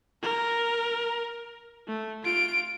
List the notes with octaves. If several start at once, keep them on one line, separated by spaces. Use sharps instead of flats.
A#4
A3
F4 D7